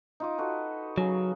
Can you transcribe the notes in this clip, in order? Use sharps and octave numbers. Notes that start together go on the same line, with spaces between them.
D#4 F4 D6
F#4 A4 B4
C#3 F#3 C#4